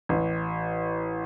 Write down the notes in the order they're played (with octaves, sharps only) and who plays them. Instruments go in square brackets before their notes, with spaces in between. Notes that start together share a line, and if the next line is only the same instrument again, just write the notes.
[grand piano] A1